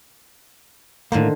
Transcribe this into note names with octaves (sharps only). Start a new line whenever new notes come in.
A2 D3 D#3 A#3 C5